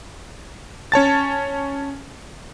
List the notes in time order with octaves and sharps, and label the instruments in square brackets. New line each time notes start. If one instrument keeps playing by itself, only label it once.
[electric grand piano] C#4 C#5 A5 A6